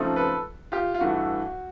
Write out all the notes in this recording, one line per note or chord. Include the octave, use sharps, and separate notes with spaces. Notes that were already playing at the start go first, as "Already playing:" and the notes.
Already playing: C#3 F3 A3 C4 D#4
A4 B4
F4 G4
F4
G2 E3 A3 F#4